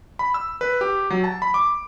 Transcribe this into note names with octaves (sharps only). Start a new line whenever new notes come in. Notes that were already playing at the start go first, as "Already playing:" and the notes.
B5
E6
B4
G4
F#3
A5
B5
D6